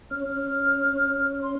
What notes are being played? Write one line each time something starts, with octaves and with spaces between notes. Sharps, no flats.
C#4 F6
C6